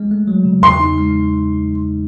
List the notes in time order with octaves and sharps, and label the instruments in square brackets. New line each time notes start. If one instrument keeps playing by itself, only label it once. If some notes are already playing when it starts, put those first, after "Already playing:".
Already playing: [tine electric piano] G#3
A3
F#3
C#3
[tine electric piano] E2 [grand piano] C6
[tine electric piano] D#4
G#3